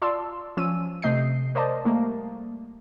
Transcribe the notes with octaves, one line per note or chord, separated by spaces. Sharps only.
F4 D5 A5 C6 E6
F3 C#4 E6 D#7
C3 A3 D#5 G6 C7
A#4 C5 D5 D#5 A5
G3 A3 A#3